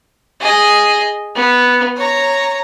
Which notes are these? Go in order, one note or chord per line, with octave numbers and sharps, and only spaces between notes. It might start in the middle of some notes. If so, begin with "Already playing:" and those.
G#4 D#5
B3
C#5 A#5